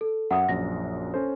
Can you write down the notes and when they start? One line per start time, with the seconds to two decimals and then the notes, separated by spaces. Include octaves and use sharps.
0.01 A4
0.31 F#2 E5 F#5 D#6
0.49 A#1 F#2 A#6
1.14 C#4 A4 C5